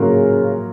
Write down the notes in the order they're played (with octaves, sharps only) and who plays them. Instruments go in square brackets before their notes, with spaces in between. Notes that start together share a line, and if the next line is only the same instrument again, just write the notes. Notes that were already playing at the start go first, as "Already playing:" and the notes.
Already playing: [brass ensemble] C#3 [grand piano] F#3 A#3 F4 A#4 F5